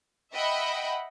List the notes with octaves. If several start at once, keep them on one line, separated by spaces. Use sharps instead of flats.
D#5 E5 F#5 G5 B5